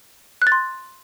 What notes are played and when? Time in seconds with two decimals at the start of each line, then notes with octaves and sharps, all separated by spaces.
0.42 F#6
0.47 A6
0.52 C6